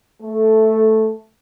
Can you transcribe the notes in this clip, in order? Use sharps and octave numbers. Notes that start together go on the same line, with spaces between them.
A3